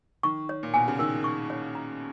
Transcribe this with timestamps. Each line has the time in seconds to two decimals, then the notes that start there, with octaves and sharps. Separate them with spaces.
0.23 D#3 C#6
0.49 C#5
0.63 A#2
0.74 B2 G#5
0.88 C#3
0.99 D#3 A#4
1.24 C#6
1.50 C#5
1.75 A#5